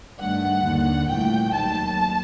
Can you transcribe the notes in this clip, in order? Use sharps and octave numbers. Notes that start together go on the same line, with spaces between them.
G2 D#3 A3 F#5
D#2 D3 G3
C2 A#2 A3 G5
D#2 D#3 F#3 A5